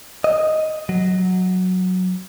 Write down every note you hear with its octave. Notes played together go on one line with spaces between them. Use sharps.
D#5
F#3